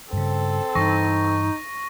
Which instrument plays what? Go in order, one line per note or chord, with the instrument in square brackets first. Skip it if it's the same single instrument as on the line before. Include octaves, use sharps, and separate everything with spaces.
[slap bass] G2 C#3 [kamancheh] C4 A4
[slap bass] G2 E3 [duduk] D#4 [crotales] C#6 A#6